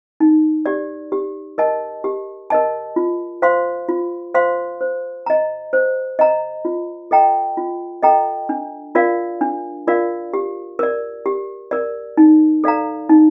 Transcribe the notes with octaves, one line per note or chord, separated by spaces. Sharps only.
D#4
G4 D5
G4
A#4 D#5 A5
G4
A#4 D#5 A5
F4
C5 F5 C6
F4
C5 F5 C6
C5
D#5 A#5
C5
D#5 A#5
F4
A4 D#5 G5 A#5
F4
A4 D#5 G5 A#5
D4
F4 A#4 D5 F5
D4
F4 A#4 D5 F5
G4
A#4 D5
G4
A#4 D5
D#4
A4 D5 F5 A#5
D#4